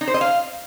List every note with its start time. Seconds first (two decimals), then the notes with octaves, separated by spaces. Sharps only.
0.01 D#4
0.08 C5
0.14 D#5
0.21 F5